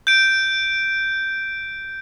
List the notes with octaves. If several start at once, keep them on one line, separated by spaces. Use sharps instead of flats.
G6 D7